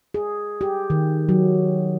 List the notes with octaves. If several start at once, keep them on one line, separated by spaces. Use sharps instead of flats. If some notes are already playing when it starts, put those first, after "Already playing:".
G#4
G4
D#3
F#3